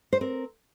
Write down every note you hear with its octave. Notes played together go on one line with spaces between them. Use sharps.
C5
C4 A#4